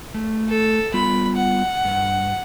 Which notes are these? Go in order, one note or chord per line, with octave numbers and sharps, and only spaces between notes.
A3
A4
G3 B3 F4 B5
F#5
G2